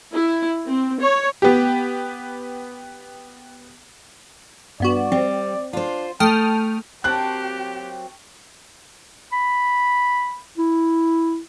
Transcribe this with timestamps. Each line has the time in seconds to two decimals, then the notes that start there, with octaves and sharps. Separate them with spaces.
0.12 E4
0.66 C4
1.00 C#5
1.42 B3 G4
4.80 G2 B3 F#4 D5
5.12 G3 C4
5.73 D4 F4 C5
6.20 A3 G5 A5 D#6 F6
7.04 F#3 A#3 C4 G4 G5 A5 C#6 F#6
9.32 B5
10.58 E4